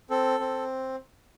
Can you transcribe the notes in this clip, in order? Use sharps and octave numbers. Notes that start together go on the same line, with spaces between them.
C4 A4
C4